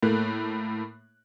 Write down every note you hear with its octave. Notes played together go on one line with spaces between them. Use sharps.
A2 A3 A#3 F#6